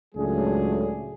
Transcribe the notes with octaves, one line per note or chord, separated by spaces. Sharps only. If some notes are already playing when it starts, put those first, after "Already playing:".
C#2 A2 F#3 A3 D4 G#4